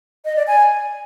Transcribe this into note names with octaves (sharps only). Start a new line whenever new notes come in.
D#5
D5
G#5